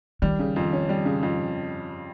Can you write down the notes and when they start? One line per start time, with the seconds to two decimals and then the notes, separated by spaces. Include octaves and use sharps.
0.22 D#3 G3
0.39 C#3
0.56 F2
0.73 C#4
0.89 G3
1.05 C#3
1.23 F2